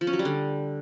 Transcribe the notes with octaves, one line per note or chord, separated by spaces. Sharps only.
F3
C#4
F#3
G3
D3